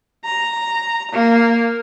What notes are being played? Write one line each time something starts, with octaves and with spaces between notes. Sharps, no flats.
A#5
A#3